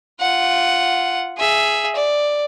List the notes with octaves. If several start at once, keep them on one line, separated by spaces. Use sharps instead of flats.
F4 F#5
G#4 E5
D5